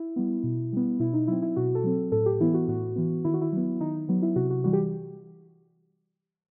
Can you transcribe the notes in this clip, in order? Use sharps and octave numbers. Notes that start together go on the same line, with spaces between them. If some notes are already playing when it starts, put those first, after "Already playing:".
Already playing: E4
G3 B3
B2
G3 B3
B2 E4
D#4
F#3 C4 E4
E4
B2 F#4
A4
F#3 C4
A2 A4
G4
E3 B3 E4
F#4
A2 F#4
E3 B3
D#3 E4
F#4
E4
F#3 B3
D#3 D#4
F#3 B3
E4
C3 F#4
F#4
E3 G3 F#4
G4